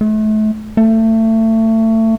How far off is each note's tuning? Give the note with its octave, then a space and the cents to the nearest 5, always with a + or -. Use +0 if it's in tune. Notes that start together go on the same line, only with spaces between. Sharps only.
A3 -35
A3 +25